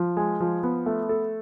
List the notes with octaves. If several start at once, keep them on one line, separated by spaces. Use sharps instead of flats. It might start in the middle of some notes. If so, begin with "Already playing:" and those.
Already playing: F3
G#3
F3
B3
A3
A4